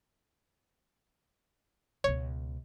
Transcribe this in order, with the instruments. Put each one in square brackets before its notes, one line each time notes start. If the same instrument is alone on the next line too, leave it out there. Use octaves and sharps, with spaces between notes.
[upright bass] C#2 B2 [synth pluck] C#5